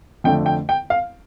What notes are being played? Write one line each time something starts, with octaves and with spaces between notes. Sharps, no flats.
F2 D3 A3 G5
G5
G5
F5